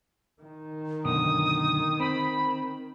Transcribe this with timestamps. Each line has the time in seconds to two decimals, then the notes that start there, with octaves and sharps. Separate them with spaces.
0.41 D#3
1.04 F#2 B2 D3 D#6
2.00 C4 B5